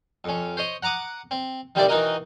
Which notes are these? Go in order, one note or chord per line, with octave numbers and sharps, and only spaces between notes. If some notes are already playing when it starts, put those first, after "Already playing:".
F2 C#4
C5 C#5 D#5
F#5 A#5 D6 D#6
C4
D#3 G3 C4 E4 A4 D5
D#3 E3 D#4 F#4 A#4 D#5